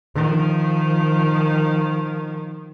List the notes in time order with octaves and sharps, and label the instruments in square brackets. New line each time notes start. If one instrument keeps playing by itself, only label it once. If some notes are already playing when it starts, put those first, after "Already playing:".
[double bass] D#3 F3